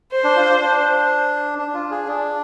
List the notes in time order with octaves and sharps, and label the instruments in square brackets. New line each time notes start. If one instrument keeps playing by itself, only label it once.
[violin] C5
[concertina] D4
F4
D4
D4
D4
F4
G#4
D4